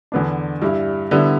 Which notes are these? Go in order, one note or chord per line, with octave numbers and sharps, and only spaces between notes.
E2 D3 B3 D4
G2 G3 E4
D3 G3 B3 E4